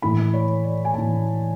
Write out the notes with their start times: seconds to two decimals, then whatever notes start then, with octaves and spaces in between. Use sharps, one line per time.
0.02 A2 E3 B5
0.34 C#5
0.64 D5
0.85 G#5
0.94 A2 E3 A5